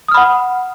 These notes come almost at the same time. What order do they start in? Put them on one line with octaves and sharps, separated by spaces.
D#6 F6 B5 F#5